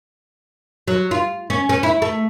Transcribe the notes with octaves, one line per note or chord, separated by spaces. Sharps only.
F#3
F4
C#4
C#4
E4
A3